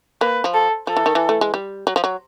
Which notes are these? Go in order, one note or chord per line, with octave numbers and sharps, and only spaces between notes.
A#3 B4
F3
A4
F3 A4
E3
D#3
E3
A3
G#3
G3
F#3
F3
F#3